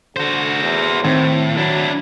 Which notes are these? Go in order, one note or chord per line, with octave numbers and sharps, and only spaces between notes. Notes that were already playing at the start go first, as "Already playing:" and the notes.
D3 F#4 C5
E2
A2 D#3 C4
F#3 D4 E4